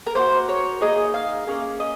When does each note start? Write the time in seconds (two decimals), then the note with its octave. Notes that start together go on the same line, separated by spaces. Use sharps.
0.07 A#4
0.15 A#3 D#4 C5
0.19 F#4
0.49 C#5
0.80 A#3 D#4 G#4 D#5
1.14 F5
1.47 A#3 C#4 G#4
1.80 D#5